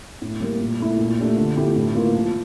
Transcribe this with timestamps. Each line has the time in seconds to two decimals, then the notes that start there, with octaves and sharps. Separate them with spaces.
0.22 A2
0.40 G3 A#3
0.60 A#2
0.80 A3 E4
0.99 A#2
1.18 A3 D4 G4
1.37 D3
1.57 F3 A3 E4 G4
1.76 A2
1.95 E3 A#3 F4
2.14 F3